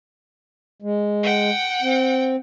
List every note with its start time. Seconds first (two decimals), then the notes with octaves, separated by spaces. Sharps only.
0.82 G#3
1.23 F#5 G5
1.82 C4